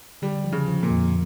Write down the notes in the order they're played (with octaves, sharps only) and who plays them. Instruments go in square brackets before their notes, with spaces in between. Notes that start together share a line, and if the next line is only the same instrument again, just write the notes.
[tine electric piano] D3 [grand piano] G3
[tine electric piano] F3
[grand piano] C#3
[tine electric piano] F3
[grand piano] A#2
[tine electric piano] F2